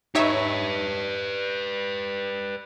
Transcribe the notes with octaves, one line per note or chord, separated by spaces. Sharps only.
D#4 G4 B4 C#5 E5